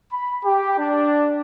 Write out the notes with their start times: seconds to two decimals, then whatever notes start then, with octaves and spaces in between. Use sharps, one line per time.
0.12 B5
0.45 G4
0.79 D4